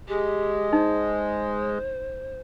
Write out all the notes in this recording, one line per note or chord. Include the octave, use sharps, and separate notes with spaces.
G#3 G4
D#4 C5